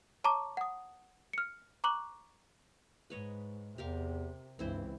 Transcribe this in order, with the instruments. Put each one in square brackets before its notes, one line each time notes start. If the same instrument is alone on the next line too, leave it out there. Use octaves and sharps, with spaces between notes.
[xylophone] C#5 A5 A#5 C#6 D6
F#5 D#6
F6 C#7
A#5 C#6 D6 F#6 F#7
[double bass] G#2 [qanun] B4 C#5 D#5
[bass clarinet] E2 [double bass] C3 [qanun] G4 A#4 F5
[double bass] C#2 E3 [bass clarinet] G2 [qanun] C4 E4 C5